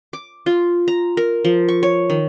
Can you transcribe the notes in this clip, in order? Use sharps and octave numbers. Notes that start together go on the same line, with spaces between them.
D6
F4
A#5
A#4
F3
C#6
C#5
D#3